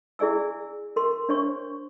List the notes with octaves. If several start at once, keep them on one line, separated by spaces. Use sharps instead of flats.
E4 G#4 D5 G#5 E6
A#4 C6
D4 C5 C#5 C#6